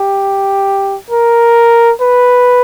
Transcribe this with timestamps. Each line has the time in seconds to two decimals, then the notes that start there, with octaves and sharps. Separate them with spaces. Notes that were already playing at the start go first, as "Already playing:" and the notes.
Already playing: G4
1.10 A#4
2.01 B4